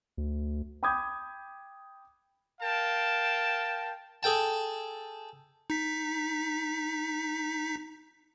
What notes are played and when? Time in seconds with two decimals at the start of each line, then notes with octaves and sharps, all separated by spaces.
0.17 D2
0.83 G5 B5 D6 D#6 G6 G#6
2.60 A#4 F5 G5 A5
4.23 G#4 A4 G5 A5
5.70 D#4 B6